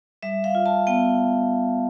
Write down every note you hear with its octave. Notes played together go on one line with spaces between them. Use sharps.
G3 E5
F5
F4
A5
B3 G5